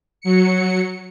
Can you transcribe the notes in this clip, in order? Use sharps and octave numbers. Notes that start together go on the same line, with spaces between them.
F#3 C#7